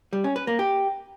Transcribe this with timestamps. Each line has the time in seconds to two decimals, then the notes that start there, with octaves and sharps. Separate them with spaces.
0.13 G3
0.24 C#4
0.36 B4
0.47 A#3
0.59 G4